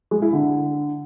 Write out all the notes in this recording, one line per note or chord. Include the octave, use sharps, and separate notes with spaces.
G#3
E4
D3